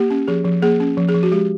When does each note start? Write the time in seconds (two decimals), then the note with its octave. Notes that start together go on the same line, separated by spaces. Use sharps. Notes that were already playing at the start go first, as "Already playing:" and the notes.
Already playing: A#3 G4
0.10 C#4
0.28 F3 G#4
0.45 F3
0.62 A#3 G#4
0.80 C#4
0.97 F3
1.09 G#4
1.14 F3
1.23 F#4
1.32 G#3 G4